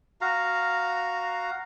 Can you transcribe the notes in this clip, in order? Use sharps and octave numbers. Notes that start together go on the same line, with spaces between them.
F#4 F5 A#5